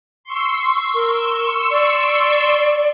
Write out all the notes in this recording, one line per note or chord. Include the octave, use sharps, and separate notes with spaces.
C6 C#6 E6
A#4
D5